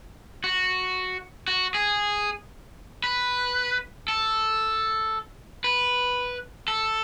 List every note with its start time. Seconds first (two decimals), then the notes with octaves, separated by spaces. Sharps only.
0.44 F#4
1.48 F#4
1.74 G#4
3.04 B4
4.08 A4
5.64 B4
6.68 A4